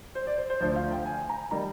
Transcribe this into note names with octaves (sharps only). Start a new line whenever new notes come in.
C5
D5
C5
C5
D2 D3 F3 C5
F5
G5
G#5
A#5
D#3 G3 A#5